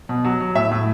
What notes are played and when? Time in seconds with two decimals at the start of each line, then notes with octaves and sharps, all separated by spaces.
0.09 B2
0.25 F#3
0.40 F#3
0.55 A2 E5
0.72 A2